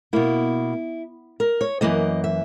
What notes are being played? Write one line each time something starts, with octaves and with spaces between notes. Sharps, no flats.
B2 A#3 E4
A#4
C#5
F#2 C#3 E3 A#3 D#5
E5